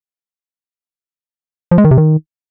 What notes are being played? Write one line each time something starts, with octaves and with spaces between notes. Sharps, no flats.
F3
G#3
D#3
C3
D#3